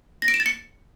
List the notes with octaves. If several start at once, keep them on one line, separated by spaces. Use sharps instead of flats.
A#6
D7
E7
A6
C#7